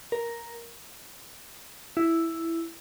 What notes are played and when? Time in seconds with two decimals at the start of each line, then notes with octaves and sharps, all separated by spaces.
0.12 A#4
1.97 E4